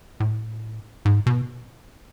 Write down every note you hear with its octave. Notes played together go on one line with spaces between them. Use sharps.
A2
G#2
B2